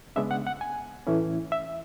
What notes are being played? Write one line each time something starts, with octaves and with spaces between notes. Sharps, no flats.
C#3 G#3 B3 D4 E5
F#5
F#5
G#5
A2 E3 A3 C#4 E4
E5